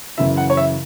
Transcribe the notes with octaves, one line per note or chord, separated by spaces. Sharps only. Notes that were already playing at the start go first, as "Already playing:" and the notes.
F#2 C#3 E3 E5
F#5
C#5
E5